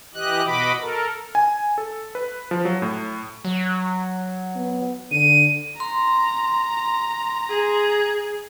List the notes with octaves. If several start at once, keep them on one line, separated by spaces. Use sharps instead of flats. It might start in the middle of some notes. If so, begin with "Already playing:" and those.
E3 G4 D#5 F#6
B2 F#4 D#5 B5 D6
A4 A#4
G#5
A4
B4
F3
F#3
A2
F#3
B3
D3 D#7
A#5 C6
G#4